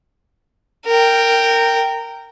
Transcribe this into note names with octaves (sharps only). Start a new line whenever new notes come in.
A#4 G5